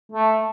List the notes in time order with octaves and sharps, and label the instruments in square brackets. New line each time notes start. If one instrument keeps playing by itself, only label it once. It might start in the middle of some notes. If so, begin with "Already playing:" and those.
[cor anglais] A3